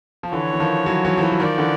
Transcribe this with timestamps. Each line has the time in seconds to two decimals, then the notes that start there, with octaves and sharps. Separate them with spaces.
0.23 F3
0.32 D3 E3 C#5
0.54 E3
0.59 D#3 F3
0.86 E3 F#3
1.05 E3 F#3
1.17 F3
1.22 E3 F#3
1.32 F#3
1.40 D#3 F3 D5
1.58 D3 E3